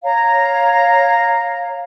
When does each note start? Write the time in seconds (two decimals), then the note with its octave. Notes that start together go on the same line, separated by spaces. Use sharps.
0.04 C#5 F5 A#5